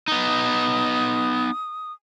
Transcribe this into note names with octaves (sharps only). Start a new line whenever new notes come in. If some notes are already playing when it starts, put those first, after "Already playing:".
B3 D#4 D#6